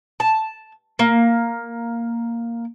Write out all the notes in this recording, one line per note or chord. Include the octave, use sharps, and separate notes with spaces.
A5
A#3